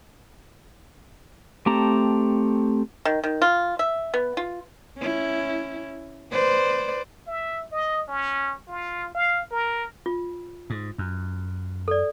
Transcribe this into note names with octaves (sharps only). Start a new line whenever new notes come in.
A3 C4 G4 A5 A#5
D#3
D#3
F4
E5
B3
F4
C#4 E4
B4 C5 D5
E5
D#5
C#4
F4
F5
A#4
F4
G#2
F#2
A4 D5